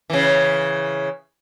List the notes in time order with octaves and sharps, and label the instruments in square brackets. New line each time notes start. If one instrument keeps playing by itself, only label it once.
[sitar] C#3 E3